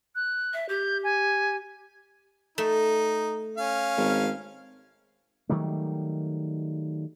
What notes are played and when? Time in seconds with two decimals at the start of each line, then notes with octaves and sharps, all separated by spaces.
0.15 F#6
0.53 E5
0.69 G4 G6
1.04 G#5
2.58 A3 D#4
3.57 C#4 F5
3.97 G#1
5.49 D#3 F#3 G3 A3